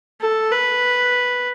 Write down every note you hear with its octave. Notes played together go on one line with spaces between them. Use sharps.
A4
B4